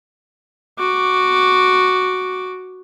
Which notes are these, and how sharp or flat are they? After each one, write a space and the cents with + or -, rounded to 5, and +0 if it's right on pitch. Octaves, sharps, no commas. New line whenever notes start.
F#4 +0 D6 +0